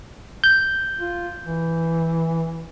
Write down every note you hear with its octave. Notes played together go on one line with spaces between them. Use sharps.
G6
F4
E3